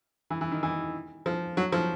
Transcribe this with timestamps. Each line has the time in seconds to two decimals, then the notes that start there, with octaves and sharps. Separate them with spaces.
0.30 E3
0.41 E3
0.52 D#3
0.63 E3
1.26 F3
1.57 F#3
1.72 F3